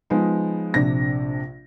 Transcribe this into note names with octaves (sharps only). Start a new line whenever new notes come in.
F3 G#3 B3 D#4
A#1 C3 D4 A#6